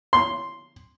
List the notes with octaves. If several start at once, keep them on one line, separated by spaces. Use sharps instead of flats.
C6